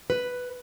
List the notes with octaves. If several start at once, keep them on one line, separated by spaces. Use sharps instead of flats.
B4